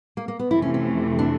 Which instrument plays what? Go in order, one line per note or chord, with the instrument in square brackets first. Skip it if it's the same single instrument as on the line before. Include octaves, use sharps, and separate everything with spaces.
[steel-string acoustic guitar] A#3
A#3
B3
[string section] F2 C3 E3 A3 [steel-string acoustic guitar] E4
[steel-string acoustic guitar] C#4
C#4
D4